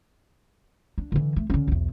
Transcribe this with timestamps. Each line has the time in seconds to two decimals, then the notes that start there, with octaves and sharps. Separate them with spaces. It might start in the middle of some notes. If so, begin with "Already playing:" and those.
0.98 D4
1.12 D3 E3
1.36 A3
1.50 D3 C#4
1.68 B1 E2